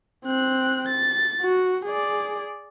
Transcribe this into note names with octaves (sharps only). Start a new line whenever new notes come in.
C4 F#6
A6
F#4
G#4 D5